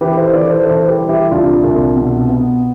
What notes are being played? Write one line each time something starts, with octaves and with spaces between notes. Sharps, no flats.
E3 G4 B4
A4 C5
E3 B4 D5
A4 C5
E3 A4 C5
G4 B4
G3
E4 G4
C2 D4 F4
C2
B2
B3